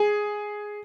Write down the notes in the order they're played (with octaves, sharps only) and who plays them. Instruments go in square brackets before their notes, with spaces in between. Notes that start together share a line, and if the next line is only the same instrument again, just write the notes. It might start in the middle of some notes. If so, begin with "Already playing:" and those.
Already playing: [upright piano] G#4